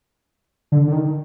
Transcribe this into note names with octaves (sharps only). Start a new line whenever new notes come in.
D3
D3
D#3